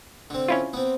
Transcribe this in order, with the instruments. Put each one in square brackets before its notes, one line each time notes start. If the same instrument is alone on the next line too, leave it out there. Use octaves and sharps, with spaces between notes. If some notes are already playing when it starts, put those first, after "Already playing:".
[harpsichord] D3 C4
[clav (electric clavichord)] C#4 E4 F4
[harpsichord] B3 C4